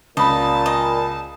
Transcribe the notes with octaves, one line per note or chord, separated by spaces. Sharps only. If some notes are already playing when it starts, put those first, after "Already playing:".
C#2 A#2 D#5 A5 B5
D#5